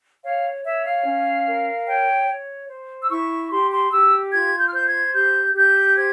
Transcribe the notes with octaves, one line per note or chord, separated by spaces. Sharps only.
C#5 F5
C#5 E5
F5
C#4
A#4
C#5 G5
C#5
C5
E6
E4 C#6
G4 C6
C6
G4 E6
F4 G#6
G6
F6
C5 G6
G#6
G4 G6
G4 G6
C5 G#6